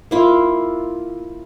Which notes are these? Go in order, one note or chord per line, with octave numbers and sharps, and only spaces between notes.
A#3 E4 F4